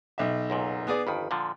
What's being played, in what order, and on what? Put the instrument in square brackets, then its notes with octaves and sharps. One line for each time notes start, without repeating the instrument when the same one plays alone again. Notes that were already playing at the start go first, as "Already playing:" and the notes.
[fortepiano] B1 E5
[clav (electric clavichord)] C#2 F#2 A#2
[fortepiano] B3 G#4 D5
[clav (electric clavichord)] G1 F2 D#3 [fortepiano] B5
[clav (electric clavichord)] A#2 D3 F3